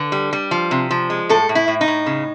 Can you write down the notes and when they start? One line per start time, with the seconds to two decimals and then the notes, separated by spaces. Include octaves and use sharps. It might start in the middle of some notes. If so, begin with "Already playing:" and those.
Already playing: D3 B4
0.12 G3
0.33 G3
0.51 F3
0.71 C3
0.91 F3
1.10 G#3
1.29 A2 A4
1.49 A2
1.55 E4
1.68 A2
1.81 D#4
1.88 A2
2.06 C#3